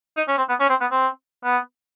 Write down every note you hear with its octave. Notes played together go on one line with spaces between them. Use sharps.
D#4
C#4
C4
B3
C#4
C4
B3
C4
B3